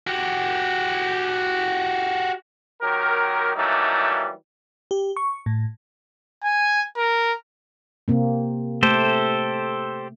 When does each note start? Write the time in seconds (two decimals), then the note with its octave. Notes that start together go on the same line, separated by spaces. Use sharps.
0.07 F#4 G4
2.82 D#3 F#3 G4 A#4
3.55 E3 F#3 G3 A3 A#3 D#4
4.91 G4
5.17 C#6
5.46 A2
6.44 G#5
6.96 A#4
8.08 C3 A#3 C4
8.83 A3 G4 A4 C5